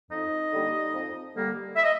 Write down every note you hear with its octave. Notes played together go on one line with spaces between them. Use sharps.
F2 D#4 D#5
D3 G3 A#3
F2
D3 G3 A#3
E5
D#5